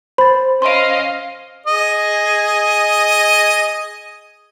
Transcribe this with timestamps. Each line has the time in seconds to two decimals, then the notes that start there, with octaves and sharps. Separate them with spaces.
0.18 C5 B5 A6
0.62 C#4 D#5 F5 C6 D7
1.66 G#4 D#5